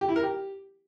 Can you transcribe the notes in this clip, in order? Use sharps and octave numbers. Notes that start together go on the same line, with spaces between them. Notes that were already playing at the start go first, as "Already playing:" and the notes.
G4
E4
A#4
G4